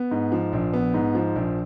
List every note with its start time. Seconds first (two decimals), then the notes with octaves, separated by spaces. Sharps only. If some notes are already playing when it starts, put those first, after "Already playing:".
Already playing: B3
0.11 G#2
0.32 F3
0.53 A#1
0.73 B3
0.94 G#2
1.15 F3
1.36 A#1